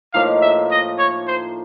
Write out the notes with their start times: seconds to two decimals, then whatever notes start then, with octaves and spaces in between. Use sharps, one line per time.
0.14 A2 F3 A#3 D#4 F5
0.42 E5
0.71 D#5
0.98 C#5
1.27 C5